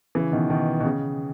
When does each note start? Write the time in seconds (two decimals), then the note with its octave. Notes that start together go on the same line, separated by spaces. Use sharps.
0.15 C#3 E3
0.32 B2 D#3
0.50 B2 D#3
0.80 B2
0.85 C#3